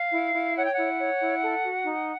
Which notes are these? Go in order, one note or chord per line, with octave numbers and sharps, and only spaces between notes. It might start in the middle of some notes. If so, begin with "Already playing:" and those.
Already playing: F5
E4
E4
C#5 F#5
G5
E4 F#5
C#5
E4
A4
F#4
D#4